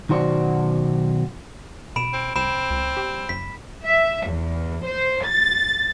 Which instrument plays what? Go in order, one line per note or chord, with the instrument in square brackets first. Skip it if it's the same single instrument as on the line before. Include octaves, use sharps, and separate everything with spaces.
[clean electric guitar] B1 D#3 F#4 C5 D5 F#5
[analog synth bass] B2 [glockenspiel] B5 D7 E7
[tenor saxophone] C4
[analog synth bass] C2 [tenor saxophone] C4 [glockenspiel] B5 E7
[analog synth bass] C#2
G3
[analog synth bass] F#1 [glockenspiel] B6
[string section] E5
E2
C5
A6